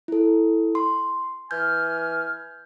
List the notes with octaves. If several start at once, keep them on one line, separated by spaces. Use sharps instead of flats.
E4 A4
C6
E3 G#5 F6 G6